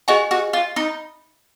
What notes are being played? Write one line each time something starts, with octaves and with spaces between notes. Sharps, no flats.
F#4 G#4 D#5 G#5
F#4
F4
D#4